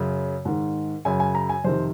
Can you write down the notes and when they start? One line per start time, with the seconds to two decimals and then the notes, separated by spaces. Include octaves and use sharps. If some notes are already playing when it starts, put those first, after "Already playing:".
Already playing: F#2 C#3
0.45 G#2 D#3
1.05 F#2 C#3 G#5
1.20 G#5
1.35 A#5
1.49 G#5
1.64 F2 C3 D#3 C5